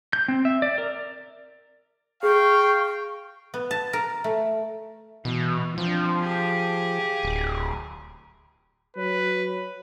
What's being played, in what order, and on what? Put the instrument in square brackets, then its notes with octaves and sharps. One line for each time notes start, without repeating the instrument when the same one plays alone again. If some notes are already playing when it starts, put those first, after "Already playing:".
[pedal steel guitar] G6
C4
E5
D5
A#4
[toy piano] G#4 [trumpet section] F5 G5 [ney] C#6
[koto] B3
A5
A#4
A3
[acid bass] B2 [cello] E3
[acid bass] F3 [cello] C4 D4
[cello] G4 G#4
[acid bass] D1
[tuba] F#3 [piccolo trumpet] B4